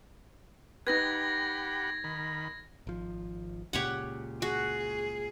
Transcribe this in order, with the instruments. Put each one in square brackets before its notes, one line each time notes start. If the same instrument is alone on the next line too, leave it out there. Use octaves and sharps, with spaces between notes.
[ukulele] D#4 B4 [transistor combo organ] G4 F#5 B5 [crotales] G#6 A#6
[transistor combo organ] D#3 B5
[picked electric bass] G#1 F3
[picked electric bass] C#2 A#2 C#3 [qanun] G4 C#5 F#5
[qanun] F#4 [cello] G#4